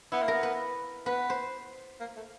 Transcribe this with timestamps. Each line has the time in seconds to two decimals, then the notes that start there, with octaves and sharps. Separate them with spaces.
0.12 B3 E4
0.22 A#3
0.28 B3 A#4
0.43 B4
1.06 B3 B4
1.30 C5
2.00 A#3
2.16 A3